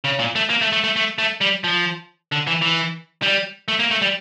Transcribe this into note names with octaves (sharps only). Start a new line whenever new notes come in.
C#3
A#2
A3
A#3
A3
A3
A3
A3
A3
G3
F3
D3
E3
E3
G3
A3
A#3
A3
G3